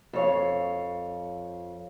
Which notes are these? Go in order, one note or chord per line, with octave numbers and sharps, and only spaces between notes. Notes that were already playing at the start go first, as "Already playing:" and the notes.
F2 C#5 F5